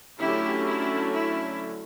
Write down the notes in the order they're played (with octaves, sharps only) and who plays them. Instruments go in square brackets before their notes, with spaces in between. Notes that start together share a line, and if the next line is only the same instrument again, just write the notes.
[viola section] D3 F#3 A3 C#4 E4 G4
E4
E4